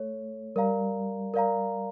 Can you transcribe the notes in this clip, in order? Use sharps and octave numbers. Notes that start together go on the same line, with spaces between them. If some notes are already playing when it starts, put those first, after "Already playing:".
Already playing: A3 A4 C#5
G3 A#4 D5 F5 A#5
A#4 D5 F5 A#5